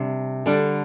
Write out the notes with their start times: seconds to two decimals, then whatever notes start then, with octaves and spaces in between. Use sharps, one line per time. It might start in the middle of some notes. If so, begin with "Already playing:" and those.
Already playing: C3 G3 D4
0.46 D3 G3 D4